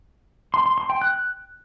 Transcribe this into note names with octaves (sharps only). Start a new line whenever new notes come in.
C6
C6
C6
G5
F#6